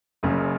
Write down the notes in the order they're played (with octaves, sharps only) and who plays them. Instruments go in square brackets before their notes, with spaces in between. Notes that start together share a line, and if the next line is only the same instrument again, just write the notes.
[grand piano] F#1 F#2 C#3